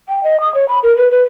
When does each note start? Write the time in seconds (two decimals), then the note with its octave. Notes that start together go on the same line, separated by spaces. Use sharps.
0.09 G5
0.23 D#5
0.40 D#6
0.55 C#5
0.68 B5
0.83 A#4
0.97 B4
1.11 B4